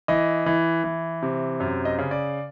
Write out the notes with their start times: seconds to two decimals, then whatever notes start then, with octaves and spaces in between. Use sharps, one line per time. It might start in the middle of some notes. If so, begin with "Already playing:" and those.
0.08 E3 D#5
0.46 E3
0.84 E3
1.22 C3
1.60 F#2
1.85 D#5
1.99 C#3
2.11 D5